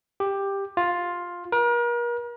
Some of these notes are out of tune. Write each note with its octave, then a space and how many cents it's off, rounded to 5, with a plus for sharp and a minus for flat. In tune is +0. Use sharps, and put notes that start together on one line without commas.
G4 +10
F4 +10
A#4 +40